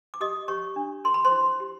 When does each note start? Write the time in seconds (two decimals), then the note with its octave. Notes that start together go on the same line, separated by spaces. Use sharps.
0.14 D6
0.21 G4 D#5 D#6
0.48 G4 C#5 C#6
0.76 D4
1.04 A#4 C6
1.14 B5
1.25 C5 C6
1.31 E4
1.60 G4